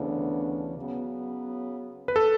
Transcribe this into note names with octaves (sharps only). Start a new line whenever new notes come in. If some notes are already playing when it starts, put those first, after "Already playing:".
Already playing: D2 C#3 E3 B3 D4
C#3 F#3 B3
B4
A4